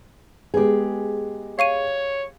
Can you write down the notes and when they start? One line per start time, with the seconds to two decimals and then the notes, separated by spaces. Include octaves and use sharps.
0.54 G#3 B3 G4 G#4
1.59 C#5 F5 C#6 D#7